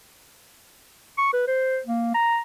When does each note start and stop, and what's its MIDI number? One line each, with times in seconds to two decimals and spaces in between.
1.18 1.30 85
1.33 1.47 71
1.48 1.79 72
1.86 2.14 58
2.14 2.40 82